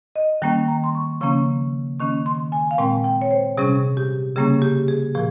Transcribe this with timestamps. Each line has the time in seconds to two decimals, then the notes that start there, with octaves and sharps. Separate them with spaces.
0.16 D#5
0.42 D#3 G3 A#3 C#4 G5
0.68 A#5
0.84 C6
0.95 C#6
1.21 C#3 F3 A#3 C#4 C#6
2.00 D#3 A#3 C#4 C#6
2.26 C6
2.52 G#5
2.71 F5
2.78 A#2 G#3 C4 G5
3.04 G5
3.22 C#5
3.31 C5
3.57 C3 G3 C#4 G#4
3.97 G4
4.36 C#3 G3 A#3 C#4 G#4
4.62 G4
4.88 G#4
5.15 A#2 F3 G#4